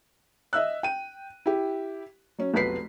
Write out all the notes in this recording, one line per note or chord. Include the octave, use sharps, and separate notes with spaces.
D#5 E5 E6 F#6
G5 D#7
E4 G4
F#3 C#4
F1 B1 F3 B4 B6 C7